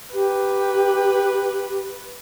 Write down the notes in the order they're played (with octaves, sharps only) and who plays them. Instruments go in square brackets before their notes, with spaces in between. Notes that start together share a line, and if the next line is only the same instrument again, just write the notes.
[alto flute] G4 [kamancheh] B4